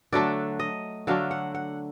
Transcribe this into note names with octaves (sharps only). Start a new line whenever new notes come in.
D3 F#3 A3 D4 D5
D#5
D3 F#3 A3 D4 F5
F#5
F#5